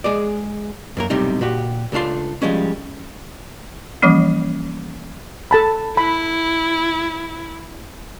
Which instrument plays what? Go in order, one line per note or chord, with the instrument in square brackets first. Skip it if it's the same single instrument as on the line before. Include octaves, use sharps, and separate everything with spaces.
[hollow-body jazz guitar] G#3 G#4 D5
F#2 A#3 A#4
B1 A2 C3 G3 D#4
A#2 F#4 G4
C#2 A3 D4 F4 C6
F3 G3 G#3 C#4
[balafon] E3 F3 G3 A#3 C#4
[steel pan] A4 A5 B5
[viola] E4 [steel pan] B5